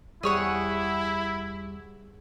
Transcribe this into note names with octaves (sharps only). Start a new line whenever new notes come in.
E2 G3 E4 G#4 C#5 F#5